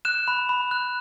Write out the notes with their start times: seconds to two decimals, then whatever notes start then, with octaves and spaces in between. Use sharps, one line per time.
0.05 F#6 E7
0.28 B5
0.49 B5
0.71 F#6